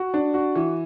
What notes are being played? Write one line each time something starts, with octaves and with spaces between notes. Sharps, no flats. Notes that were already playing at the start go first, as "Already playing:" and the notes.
Already playing: F#4
D4
F#4
E3